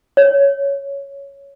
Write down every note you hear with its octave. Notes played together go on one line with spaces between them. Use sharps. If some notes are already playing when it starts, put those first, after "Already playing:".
C#5